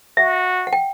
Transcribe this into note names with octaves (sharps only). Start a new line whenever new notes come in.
F#4 E5
F#5
G5